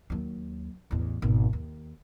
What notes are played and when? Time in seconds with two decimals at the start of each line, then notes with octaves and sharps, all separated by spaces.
0.10 D#2 F#3
0.91 A1 E2
1.22 G#1 B2
1.53 D#2